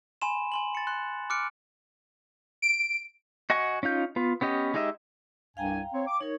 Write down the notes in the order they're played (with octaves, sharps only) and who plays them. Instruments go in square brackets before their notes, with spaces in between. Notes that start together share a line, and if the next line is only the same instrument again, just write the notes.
[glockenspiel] G#5 B5 C6 E7
G#5 C6 F#7
A6 C#7
C6 F#6
D6 F6 F#6 C#7 D7
[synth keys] D7
[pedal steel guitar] F#4 D#5 F#5 G#5 C#6
C#4 D#4 F4 G6
B3 F4
B3 C#4 G4 D#5
G#3 D#4 G4 D#5 E5
[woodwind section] C2 G2 G#5 [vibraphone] F5 G5 A#5
[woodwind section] C4 C#5
D6
[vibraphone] D#4 A#4 [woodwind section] C#5